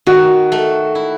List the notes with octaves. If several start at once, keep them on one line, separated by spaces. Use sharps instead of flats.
D#3 F#4
A3
E4